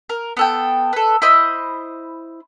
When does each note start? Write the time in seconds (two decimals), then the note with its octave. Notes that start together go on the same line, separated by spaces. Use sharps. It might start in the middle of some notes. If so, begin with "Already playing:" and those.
0.09 A#4
0.37 B3 A4 G5
0.93 A4 B4
1.22 E4 C5 D#5 B5